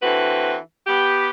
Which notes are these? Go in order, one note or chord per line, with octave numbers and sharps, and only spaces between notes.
D3 E3 C4 F#4 B4
B3 G4